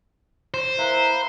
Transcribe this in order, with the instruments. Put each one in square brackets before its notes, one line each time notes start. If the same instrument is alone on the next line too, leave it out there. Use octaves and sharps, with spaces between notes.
[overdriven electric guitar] C5
[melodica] A#3 E4 B4